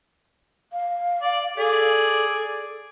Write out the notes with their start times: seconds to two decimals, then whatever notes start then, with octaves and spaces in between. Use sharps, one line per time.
0.73 F5
1.22 D5
1.57 G#4 A4 D5